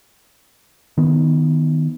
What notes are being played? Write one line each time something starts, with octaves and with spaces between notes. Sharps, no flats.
D#3 B3